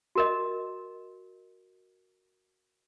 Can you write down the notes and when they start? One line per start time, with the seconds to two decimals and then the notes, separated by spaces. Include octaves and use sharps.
0.15 F#4 A#4 D#5